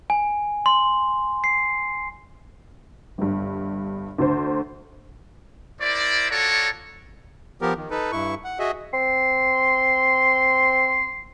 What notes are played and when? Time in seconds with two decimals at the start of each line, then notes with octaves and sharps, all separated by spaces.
0.10 G#5
0.66 C6
1.44 C7
3.18 G1 G2
4.18 D2 D3 C5
5.80 E4 A#4 C5 D5
6.30 F4 F#4 A4 C#5 D5 A#5
7.62 F3 B3 G4 A#4
7.77 D#3
7.91 D#4 A4 B4
8.12 G2 E4 C#6
8.44 F#5
8.59 F#4 G#4 D#5 E5
8.94 C4 C6